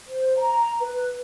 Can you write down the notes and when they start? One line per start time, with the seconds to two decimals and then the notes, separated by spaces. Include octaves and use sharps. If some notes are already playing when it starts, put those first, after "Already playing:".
0.09 C5
0.37 A#5
0.80 B4